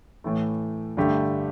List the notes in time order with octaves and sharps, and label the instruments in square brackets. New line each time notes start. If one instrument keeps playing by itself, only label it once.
[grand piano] A2 E3 A3
G2 D3 A3 G4